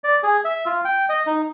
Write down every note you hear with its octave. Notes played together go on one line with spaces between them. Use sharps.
D5
G#4
E5
F4
G5
D#5
D#4